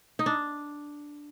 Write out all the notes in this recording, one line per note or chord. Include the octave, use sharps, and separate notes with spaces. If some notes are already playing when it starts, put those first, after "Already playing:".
D#4
D4